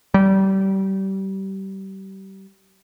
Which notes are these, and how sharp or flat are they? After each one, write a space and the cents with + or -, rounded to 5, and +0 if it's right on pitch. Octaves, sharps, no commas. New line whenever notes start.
G3 -25